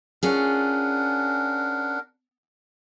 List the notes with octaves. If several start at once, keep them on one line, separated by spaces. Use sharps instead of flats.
C#4 D4 F4 G#4 A#4 F#5